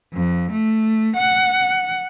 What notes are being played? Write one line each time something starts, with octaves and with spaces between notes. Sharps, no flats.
F2
A3
F#5